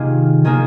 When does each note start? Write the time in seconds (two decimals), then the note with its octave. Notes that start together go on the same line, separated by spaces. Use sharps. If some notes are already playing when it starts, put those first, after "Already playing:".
Already playing: C3 D#3 A#3 F4 G#4
0.44 D#3 A#3 D#4 G#4